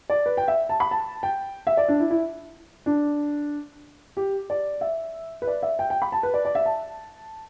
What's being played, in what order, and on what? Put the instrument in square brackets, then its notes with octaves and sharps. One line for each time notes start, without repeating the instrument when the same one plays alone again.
[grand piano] D5
B4
G5
E5
A5
B5
A5
G5
E5
D5
D4
E4
E4
D4
G4
D5
E5
B4
D5
E5
G5
G5
B5
A5
B4
D5
D5
E5
A5